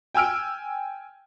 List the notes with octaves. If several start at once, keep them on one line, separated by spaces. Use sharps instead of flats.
G5 G#5 E6 F6 D7